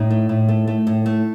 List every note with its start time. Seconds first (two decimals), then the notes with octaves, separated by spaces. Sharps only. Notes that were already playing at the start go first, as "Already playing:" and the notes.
Already playing: A2 D#4
0.10 A3
0.29 A2
0.48 A3
0.67 A3
0.87 A2
1.06 A3